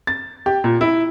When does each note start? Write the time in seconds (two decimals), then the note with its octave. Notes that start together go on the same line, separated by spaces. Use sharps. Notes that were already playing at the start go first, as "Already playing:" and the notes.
0.07 A6
0.46 G4
0.64 A#2
0.81 E4